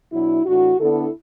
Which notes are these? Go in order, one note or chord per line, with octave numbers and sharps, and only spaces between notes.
B2 F#3 D4 E4
A2 E3 D4 F#4
D3 B3 D4 E4 A4